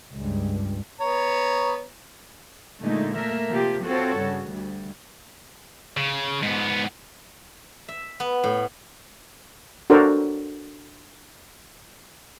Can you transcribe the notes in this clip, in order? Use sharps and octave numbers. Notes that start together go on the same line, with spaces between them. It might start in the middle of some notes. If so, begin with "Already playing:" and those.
C#2 G2
B3 C#5 A#5
A#2 D3 G#3 A3 D#4
A3 A#3 A#4 E5
C3 F3 A#3 F4 G4
C4 F4 F#4 A4 C#5
G2 C#3
D2 G3
C#3
G#2 B3
E5
B3
A2
D4 F#4 A4 A#4 C5